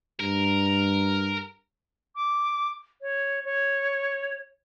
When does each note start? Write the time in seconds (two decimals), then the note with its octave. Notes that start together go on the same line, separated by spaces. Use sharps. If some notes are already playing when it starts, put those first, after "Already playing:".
0.20 G2 A#4
2.16 D6
3.02 C#5
3.45 C#5